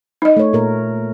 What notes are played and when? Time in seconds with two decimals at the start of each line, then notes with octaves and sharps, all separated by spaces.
0.22 D#4 D#5
0.37 A3 C#5
0.53 A#2 A#4